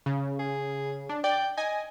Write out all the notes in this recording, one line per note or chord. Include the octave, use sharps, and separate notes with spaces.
C#3
G#4
D4
D5 G5
D#5 G#5